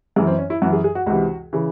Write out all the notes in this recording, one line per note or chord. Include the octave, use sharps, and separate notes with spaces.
F#2 E3 G#3
C4
C#4
E4
F#2 E3 F#4
G#4
G#4
F#4
C#2 C3 E3 F#4
C#3 E3